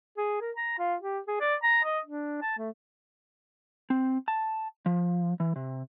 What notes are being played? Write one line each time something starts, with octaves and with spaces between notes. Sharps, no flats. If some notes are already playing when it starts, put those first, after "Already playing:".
G#4
A#4
A#5
F4
G4
G#4
D5
A#5
D#5
D4
A5
A3
C4
A5
F3
E3
C3